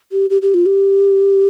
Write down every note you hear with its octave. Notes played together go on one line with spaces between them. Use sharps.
G4
G4
G4
F4
G4